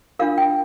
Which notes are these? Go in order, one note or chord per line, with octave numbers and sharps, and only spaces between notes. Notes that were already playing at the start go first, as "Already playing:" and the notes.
D4 F4 A#4 F5
G5